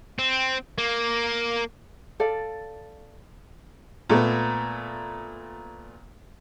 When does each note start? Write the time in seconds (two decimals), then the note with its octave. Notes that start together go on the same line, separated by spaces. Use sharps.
0.19 C4
0.78 A#3
2.20 A4 D5 F5
4.10 A#2 A3 B3